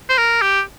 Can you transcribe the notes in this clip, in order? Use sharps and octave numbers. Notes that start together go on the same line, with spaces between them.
C5
A#4
G4